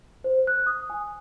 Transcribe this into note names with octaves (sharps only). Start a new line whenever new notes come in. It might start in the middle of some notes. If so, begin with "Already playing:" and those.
C5
F#6
D#6
G#5